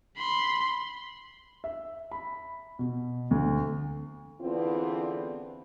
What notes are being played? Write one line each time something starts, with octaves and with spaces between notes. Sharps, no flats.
B5 C6
E5
B5
B2
D2
E2 D3 B3 C4 E4 F4